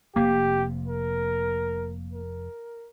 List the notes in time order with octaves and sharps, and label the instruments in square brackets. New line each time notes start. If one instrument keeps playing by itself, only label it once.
[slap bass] F1 C3 [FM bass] A#3 [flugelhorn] G4
[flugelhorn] A#4
A#4